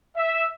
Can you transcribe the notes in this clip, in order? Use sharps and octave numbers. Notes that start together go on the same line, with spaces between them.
E5